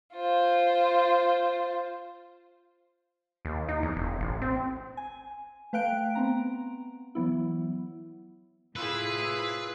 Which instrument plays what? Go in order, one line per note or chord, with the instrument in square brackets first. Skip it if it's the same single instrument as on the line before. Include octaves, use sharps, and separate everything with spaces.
[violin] F4 C5
[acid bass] D#2
D#4
E2
E1
A1
C4
[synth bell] G#5
A3 B4 F5 G5 F#6 D7
B3 C4 A#5
E3 F#3 B3 E4
[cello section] A2 C3 E4 [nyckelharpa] F4 G#4 [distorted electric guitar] B4 [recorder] E6